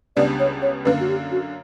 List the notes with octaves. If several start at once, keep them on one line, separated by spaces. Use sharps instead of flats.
C#2 C#3 G3 B3 D4 D5
C#5
C#5
F#2 D3 A#3 B4
F#4
G4
F#4